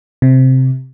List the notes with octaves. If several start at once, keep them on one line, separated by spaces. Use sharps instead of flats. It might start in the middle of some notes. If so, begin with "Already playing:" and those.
C3